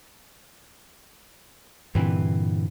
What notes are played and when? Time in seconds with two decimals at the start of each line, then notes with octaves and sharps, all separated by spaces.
1.95 G2 A#2 D3 E3 C4 B4